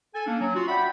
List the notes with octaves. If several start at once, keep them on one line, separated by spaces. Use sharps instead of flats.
A4 G#5
A#3 C#4 D4
F#3
F4 F#4
D5 E5 F#5 G5 B5